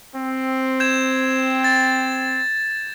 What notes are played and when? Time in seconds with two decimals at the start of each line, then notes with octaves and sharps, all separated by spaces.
0.16 C4
0.80 G6 G#6 E7
1.64 A6